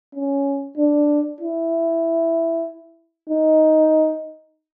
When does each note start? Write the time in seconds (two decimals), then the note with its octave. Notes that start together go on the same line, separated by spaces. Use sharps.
0.15 C#4
0.77 D4
1.41 E4
3.30 D#4